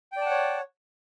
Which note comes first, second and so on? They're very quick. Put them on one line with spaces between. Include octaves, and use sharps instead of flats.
G5 D5 A5 F#5 C#5